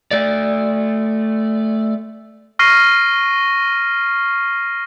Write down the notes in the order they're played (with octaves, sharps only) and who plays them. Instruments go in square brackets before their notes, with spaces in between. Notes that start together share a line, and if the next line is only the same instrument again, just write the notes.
[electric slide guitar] A3 D5
[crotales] C#6 F6 A#6 C7 D#7